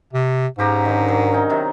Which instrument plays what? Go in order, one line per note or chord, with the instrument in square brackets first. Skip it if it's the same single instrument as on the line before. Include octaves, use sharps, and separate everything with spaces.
[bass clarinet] C3
[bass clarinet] G#2 [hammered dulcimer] C#3 G4 A#5
[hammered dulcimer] D3 D#3
F#3
C#4 D#4
C3 D#3